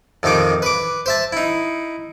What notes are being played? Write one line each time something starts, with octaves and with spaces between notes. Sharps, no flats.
F2 C3 D#3 D#4 D6
B4 D6
C5 E5 A5
D#4 E4